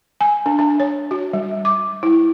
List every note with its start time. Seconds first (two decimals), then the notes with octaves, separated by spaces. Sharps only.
0.21 G#5
0.46 D4
0.59 D4
0.80 C#5
1.11 F#4
1.33 G3
1.65 D6
2.03 E4